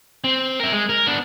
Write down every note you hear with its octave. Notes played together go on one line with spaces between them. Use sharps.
C4
A#4 E5
G#3
A#4
B3 D4